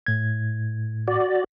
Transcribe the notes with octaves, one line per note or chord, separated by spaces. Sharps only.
A2 G#6
F#4 D5